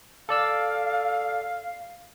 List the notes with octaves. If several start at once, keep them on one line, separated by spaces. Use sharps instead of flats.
A4 D5 F5 E6